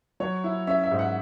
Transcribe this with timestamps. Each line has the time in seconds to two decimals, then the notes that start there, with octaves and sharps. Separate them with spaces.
0.20 F#3 C#5
0.44 E4
0.67 C#4 E5
0.84 E5
0.91 G#2
0.99 F#5